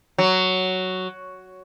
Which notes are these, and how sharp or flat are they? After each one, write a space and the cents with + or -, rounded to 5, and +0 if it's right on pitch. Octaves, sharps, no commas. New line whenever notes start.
F#3 +5